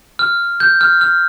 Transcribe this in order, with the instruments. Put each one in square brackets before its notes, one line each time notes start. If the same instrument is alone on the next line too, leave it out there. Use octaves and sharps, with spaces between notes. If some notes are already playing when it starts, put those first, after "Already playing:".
[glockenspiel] F6
G6
F6
F6